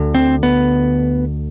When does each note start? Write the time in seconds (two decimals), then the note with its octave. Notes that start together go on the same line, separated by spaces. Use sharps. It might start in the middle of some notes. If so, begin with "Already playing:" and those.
Already playing: D2 D3
0.15 C4
0.43 B3